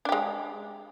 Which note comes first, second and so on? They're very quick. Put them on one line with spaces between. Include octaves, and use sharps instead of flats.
D4 G4 G#3